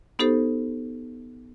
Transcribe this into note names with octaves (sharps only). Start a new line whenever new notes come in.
B3 D#4 G4 A4 C5